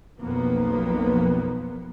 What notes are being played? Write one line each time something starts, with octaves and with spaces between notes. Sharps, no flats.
B1 F2 F3 A#3 B3